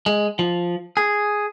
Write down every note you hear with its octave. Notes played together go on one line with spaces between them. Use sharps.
G#3
F3
G#4